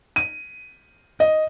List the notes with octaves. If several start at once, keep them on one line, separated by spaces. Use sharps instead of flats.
D#7
D#5